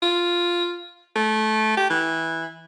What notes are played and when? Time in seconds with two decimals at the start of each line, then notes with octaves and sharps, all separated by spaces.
0.02 F4
1.16 A3
1.77 G4
1.90 E3